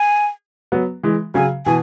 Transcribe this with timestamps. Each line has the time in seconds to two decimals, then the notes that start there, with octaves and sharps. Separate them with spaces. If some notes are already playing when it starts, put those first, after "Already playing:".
Already playing: G#5
0.72 F#3 B3
1.03 E3 G#3
1.34 C#3 F#3 G#5
1.65 B2 E3 G#5